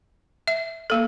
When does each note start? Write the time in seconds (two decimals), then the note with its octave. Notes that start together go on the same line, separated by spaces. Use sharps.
0.47 E5
0.90 A#3 A4